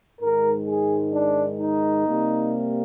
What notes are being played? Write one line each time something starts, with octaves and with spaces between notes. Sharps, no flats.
G#2 D#3 G#3 A#4
G#4
D4
D#4
C3 G3 A#3